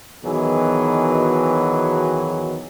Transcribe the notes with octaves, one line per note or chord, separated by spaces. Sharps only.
E2 B2 D#3 E3 F#3 G#4